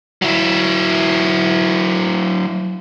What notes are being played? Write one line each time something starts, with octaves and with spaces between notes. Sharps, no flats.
F#3 E4